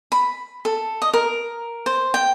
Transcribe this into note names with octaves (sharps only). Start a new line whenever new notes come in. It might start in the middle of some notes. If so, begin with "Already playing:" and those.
B5
A4
D#5
A#4
C5
G5